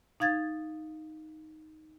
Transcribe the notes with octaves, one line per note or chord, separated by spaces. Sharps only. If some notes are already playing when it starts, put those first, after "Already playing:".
D#4 F5 G#6 A6